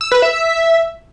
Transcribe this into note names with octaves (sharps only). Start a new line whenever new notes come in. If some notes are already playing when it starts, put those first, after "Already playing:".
E6
B4
E5